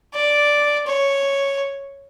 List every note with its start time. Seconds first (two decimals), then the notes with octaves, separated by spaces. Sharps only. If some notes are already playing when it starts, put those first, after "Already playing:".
0.14 D5
0.87 C#5